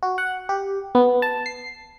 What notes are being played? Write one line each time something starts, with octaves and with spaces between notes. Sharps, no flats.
F#4
F#5
G4
B3
A5
C7